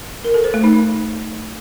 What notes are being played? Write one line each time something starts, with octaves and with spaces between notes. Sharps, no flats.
A#4
A4
C5
A3
D#4